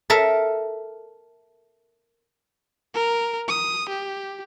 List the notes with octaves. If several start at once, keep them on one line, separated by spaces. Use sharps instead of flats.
A4 A#4 E5
A#4
D#6
G4